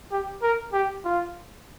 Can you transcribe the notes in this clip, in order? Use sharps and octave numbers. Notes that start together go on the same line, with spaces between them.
G4
A#4
G4
F4